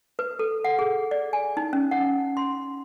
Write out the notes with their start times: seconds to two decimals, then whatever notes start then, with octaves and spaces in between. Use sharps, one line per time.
0.19 B4
0.39 A4
0.65 F#5
0.79 G#4
1.11 D5
1.33 G#5
1.57 D#4
1.73 C#4
1.91 F#5
2.37 C6